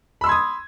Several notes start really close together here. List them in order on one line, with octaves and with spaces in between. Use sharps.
B5 E6 C6 G#6 D#6